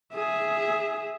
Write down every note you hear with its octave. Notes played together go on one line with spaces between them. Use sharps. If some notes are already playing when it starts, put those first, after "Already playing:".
G#4 E5